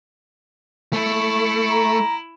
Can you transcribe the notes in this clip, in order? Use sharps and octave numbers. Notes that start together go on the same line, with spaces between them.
A3 E4
A#5